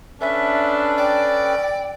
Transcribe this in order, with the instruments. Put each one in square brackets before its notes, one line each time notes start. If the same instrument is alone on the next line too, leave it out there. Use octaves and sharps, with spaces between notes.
[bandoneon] C#4 A4 B4 [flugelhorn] D4 [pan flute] E5
[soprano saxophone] D5 [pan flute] G5